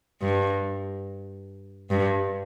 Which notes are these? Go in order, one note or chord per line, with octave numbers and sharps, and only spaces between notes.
G2
G2